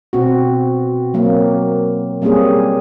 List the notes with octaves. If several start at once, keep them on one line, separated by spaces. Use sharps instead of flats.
B2 C4 F#4
F#3 A#3 C4
G3 A#3 C4 C#4 G4 G#4